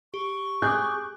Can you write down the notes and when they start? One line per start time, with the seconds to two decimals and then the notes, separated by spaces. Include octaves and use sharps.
0.14 G4 C#6
0.62 G#4 D6 F#6 G6